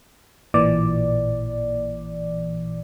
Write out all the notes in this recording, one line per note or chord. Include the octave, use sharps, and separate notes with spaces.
A1 A#2 E3 D5